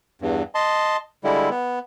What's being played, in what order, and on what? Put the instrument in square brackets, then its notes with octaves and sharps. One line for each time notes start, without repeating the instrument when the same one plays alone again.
[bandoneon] E2 G2
D#5 A5 C6
D3 G3 G#3 E4
B3